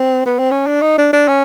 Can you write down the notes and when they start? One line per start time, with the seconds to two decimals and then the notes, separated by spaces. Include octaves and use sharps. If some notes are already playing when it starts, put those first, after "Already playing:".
Already playing: C4
0.26 B3
0.39 C4
0.51 C#4
0.66 D4
0.82 D#4
0.98 D4
1.13 D4
1.28 C#4